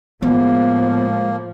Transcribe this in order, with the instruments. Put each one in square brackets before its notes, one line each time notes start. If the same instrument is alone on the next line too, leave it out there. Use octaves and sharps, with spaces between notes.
[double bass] A2 F3 [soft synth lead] G#3 [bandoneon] A#3 [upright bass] B3